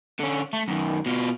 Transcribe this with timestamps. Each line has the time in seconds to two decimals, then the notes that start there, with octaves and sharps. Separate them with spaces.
0.19 D3 C#4
0.53 A3
0.68 F#2 D#3
1.06 B2 F4